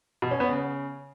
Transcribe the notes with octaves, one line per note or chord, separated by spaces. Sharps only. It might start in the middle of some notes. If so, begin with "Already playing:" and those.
B2
C#4
B3
C#3